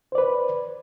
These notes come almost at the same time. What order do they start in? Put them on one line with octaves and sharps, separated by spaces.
C5 D5 B4